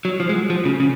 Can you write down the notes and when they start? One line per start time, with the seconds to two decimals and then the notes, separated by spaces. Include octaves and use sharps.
0.05 F#3
0.20 F3
0.29 G#3
0.34 F#3
0.50 F3
0.65 C#3
0.80 C#3